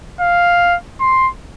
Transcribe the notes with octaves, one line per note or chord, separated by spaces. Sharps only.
F5
C6